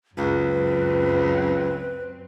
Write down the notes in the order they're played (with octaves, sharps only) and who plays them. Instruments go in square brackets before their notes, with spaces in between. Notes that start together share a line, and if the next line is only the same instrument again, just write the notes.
[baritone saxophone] C#2 [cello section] F#2 C4 [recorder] B4